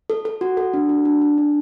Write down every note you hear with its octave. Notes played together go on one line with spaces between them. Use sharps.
A4
A4
F#4
A4
D4
F#4
D4
D4
D4